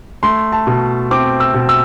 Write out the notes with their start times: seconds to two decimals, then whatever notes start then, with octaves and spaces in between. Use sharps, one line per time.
0.23 A3 C6
0.52 A5
0.67 B2
1.11 C4 D6
1.40 E6
1.54 B2
1.69 E6